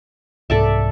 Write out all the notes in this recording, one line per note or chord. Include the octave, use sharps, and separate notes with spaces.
C2 G#2 A4 D5 E5